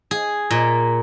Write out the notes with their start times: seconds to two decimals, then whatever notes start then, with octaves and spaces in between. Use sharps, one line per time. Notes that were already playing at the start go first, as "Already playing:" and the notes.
0.11 G#4
0.51 A#2